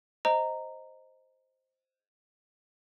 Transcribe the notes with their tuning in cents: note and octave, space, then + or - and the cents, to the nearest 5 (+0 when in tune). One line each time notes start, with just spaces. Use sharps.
C5 +0 D#5 +5 A#5 -10